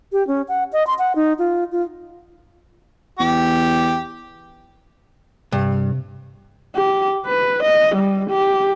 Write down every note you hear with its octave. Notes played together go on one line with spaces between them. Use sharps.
G4
C#4
F#5
D#5
C6
F#5
D#4
F4
F4
E2 G4
G2 C3
G4
B4
D#5
G3
G4